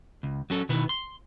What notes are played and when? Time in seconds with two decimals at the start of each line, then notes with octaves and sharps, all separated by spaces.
0.23 C#2
0.50 F#3 C#4 A4
0.69 B2 D#3 B3 E4 B4
0.89 C6